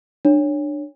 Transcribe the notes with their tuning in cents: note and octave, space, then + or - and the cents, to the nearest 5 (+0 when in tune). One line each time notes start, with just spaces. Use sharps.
D4 +20 C#5 +0